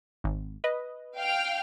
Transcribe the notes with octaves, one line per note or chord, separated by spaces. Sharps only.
G#1
B4 D#5
F5 G5 F6